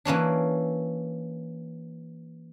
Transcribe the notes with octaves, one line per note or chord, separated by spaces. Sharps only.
E3 A#3 C#4 D4